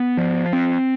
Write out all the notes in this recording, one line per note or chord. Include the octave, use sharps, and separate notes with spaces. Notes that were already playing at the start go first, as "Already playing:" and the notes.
Already playing: B3
F3
C4